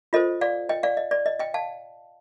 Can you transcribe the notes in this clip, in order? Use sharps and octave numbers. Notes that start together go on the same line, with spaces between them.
F4 A4 C5 D#5
D5 F5
D#5 G5
D5 F5
D#5
D5
D#5
D#5 G5
F5 A5